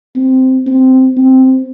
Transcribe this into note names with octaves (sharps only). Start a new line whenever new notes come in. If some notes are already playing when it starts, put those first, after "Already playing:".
C4
C4
C4